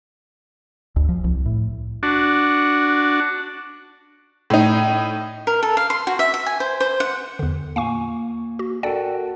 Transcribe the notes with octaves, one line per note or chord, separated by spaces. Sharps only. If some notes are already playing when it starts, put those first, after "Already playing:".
D2
F3
C2
A2
D4 F#4
A2 D#4
A#4
A4
F5
C6
F#4
E5
E5
G#5
C5
C5
F#5
E2 D3
A#2 F5 G#5 C#6
F#4
F#4 A4 A#4 D5 F#5 G5